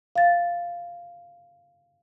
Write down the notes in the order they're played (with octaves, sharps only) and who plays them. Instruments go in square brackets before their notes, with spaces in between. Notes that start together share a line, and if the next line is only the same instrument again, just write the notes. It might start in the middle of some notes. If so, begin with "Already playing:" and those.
[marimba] F5 A6